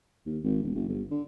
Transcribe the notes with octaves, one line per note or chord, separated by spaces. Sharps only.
D#2
G#1
E1
F#1
G1
D3